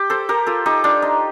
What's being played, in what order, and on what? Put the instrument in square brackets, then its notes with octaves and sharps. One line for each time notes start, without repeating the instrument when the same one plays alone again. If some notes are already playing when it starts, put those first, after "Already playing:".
Already playing: [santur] G4
A4 C5
G4 A#4
F4 A4
D#4 G4
D4 F4
D#4